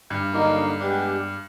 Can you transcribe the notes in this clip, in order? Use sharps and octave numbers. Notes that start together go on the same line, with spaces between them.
G2
D3 F#3 A#3 D#4
G#3 B3 D4 G4